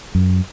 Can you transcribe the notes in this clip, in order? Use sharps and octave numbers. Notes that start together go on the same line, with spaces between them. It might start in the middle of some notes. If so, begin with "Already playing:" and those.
F#2